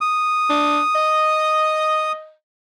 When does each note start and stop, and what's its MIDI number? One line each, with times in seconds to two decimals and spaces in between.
0.01 2.12 87
0.50 0.80 62
0.95 2.33 75